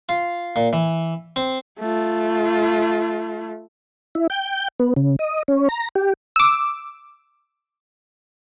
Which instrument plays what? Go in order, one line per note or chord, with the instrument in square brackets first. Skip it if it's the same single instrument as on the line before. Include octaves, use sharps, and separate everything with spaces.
[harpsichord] F4
A#2
E3
C4
[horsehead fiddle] A3 F4
[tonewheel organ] E4
G5
B3
C#3
D#5
C#4
A#5
G4
[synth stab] D6 E6